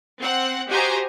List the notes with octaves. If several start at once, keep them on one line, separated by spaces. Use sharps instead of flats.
C4 F#5
F#4 G4 C5 D#5 G#5 A#5